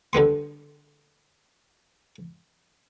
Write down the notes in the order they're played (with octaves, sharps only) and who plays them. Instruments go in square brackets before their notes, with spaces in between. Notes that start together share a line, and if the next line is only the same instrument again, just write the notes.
[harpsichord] D3 G3 B3 C6